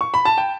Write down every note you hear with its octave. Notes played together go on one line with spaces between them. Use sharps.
C#6
B5
A5
G5